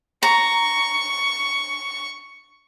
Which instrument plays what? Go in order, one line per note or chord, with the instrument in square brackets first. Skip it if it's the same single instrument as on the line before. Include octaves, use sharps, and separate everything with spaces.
[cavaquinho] A#5 [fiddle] C#6